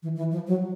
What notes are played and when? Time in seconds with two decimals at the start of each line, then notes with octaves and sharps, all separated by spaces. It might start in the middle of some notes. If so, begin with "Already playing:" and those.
0.03 E3
0.16 E3
0.31 F3
0.47 F#3